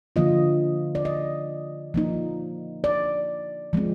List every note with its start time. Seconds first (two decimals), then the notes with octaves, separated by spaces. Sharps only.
0.16 D3 F3 A#3 F4 D#5
0.95 D5
1.05 D#5
1.94 F3 A#3 D#4
2.84 D5
3.73 F3 G#3 C4